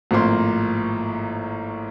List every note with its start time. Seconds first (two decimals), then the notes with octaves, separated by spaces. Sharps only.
0.11 G#1 A2 F3 A#3 C6